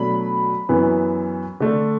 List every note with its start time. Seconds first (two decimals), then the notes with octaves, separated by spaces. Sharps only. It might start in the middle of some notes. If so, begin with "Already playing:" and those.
Already playing: B2 F#3 A3 D4 B5
0.69 F#2 E3 B3
1.60 D3 A3 D4